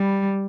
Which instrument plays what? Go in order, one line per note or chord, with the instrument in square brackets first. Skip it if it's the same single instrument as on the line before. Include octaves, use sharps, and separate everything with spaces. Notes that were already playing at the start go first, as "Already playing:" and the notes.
Already playing: [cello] G3